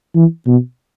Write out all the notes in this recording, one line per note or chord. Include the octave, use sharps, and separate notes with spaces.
E3
B2